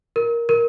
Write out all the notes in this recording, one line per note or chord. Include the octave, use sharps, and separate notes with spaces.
A#4
A#4